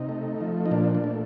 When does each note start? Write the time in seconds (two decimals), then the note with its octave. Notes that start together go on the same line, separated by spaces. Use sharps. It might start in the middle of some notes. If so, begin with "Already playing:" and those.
Already playing: C3 D#4
0.09 A3
0.41 F3
0.66 D#4
0.71 A#2 D4
0.95 D4
1.04 A3